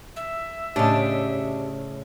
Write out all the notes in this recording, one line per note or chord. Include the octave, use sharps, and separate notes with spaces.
E5
A2 C#3 D4 G4 C#5 D#5